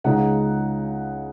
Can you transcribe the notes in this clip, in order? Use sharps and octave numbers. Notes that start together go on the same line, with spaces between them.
C#2 C#3 G#3 D#4 F#5